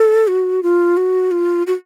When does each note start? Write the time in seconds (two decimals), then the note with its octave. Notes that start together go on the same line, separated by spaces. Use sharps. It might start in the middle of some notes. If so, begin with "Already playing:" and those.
Already playing: A4
0.28 F#4
0.63 F4
0.97 F#4
1.31 F4
1.67 F#4